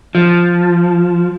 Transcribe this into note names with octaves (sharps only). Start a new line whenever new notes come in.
F3